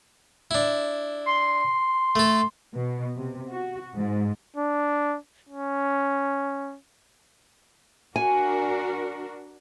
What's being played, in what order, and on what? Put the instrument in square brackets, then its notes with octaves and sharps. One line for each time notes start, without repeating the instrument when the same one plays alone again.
[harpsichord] D4 E4
[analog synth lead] C6
[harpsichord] A3 A4
[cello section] B2
C3
F#4
G#2
[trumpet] D4
C#4
[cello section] D4 F#4 A#4 [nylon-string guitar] G#5